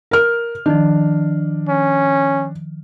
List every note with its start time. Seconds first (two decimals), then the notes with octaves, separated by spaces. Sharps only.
0.11 A#4 F6
0.66 D#3 F3 D4
1.69 C#4